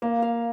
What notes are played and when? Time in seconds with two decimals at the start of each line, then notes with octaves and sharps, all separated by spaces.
0.02 A#3 F5
0.22 F5